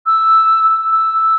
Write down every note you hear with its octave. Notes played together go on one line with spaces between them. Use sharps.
E6
E6